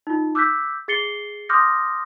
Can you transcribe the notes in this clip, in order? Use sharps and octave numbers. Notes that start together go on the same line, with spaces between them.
D#4 F4
D6 E6 F#6 G6 B6
G#4 A6 C7 C#7 G7
C6 D6 D#6 F6 G6 A#6